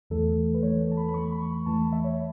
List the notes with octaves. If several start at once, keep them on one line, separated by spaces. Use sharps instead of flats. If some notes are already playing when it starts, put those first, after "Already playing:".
E2 E3 A3 A4
B4
E2 E3 A3 C#5
A5
B5
B5
E2 E3 A3 C#6
B5
C#6
B5
E2 E3 A3 A5
E5
C#5